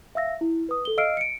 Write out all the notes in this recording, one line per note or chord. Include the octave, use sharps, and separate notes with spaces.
E5 F5 E6 A#6
E4
B4 D#6
A4 G7
D#5 F5 E6 F6 C7 D7
C#7 D7